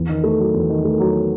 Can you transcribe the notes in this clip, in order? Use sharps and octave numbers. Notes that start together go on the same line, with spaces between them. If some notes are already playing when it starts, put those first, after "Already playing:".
Already playing: E2
D#3
A3
F#3
E2
D#3
A3
F#3